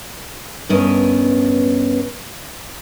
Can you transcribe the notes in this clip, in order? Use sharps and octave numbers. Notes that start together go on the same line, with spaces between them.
G2 B3 C#4 A#4 D#5